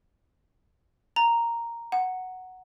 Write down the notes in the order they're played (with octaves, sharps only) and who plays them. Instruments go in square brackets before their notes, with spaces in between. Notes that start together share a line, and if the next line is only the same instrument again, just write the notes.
[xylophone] A#5
F#5